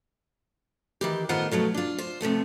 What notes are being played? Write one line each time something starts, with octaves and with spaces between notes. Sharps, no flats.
D#3 E3 G4
A2 D#3 B3 F4 C5 F#5
B2 F3 F#3 A3
D4 F4
F4 C5
C3 F3 A3 B3